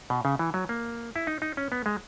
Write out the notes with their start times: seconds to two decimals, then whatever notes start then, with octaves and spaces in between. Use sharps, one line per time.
0.10 B2
0.25 C#3
0.39 E3
0.54 F#3
0.69 A#3
1.16 E4
1.27 D#4
1.42 D#4
1.57 C#4
1.72 B3
1.86 G#3